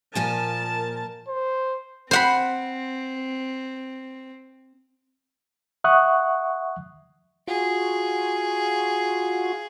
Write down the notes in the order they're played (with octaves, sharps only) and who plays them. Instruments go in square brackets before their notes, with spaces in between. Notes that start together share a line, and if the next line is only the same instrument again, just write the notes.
[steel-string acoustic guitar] A#2 F3 G#5 [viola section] A#4 A5
[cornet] C5
[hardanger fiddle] C4 [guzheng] C5 F#5 B5
[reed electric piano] E5 F#5 C#6 D#6 F#6
[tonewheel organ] F4 F#4 [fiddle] G#4